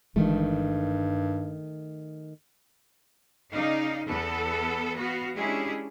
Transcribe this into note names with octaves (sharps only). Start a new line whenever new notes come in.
G1 G2 D#3 E3 G#3 A3
C#3 D#4 D5 F5
E2 B3 A4
B3 F#4 F5
G#3 C#4 D4 E4 G4 G#4